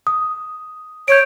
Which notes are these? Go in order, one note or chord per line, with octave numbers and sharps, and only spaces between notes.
D#6
C#5 G6 D7